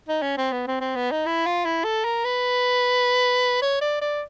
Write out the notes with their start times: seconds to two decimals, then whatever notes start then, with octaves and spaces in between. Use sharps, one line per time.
0.08 D#4
0.22 C#4
0.37 C4
0.53 B3
0.67 C4
0.81 C4
0.96 B3
1.11 D#4
1.26 E4
1.46 F4
1.65 E4
1.84 A4
2.05 A#4
2.25 B4
3.62 C#5
3.81 D5
4.01 D5